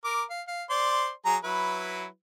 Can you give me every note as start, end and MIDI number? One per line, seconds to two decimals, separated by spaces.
0.04 0.22 70
0.04 0.22 86
0.30 0.41 77
0.48 0.63 77
0.70 1.10 72
0.70 1.10 74
0.70 1.10 84
1.26 1.37 54
1.26 1.37 68
1.26 1.37 82
1.44 2.05 54
1.44 2.05 64
1.44 2.05 71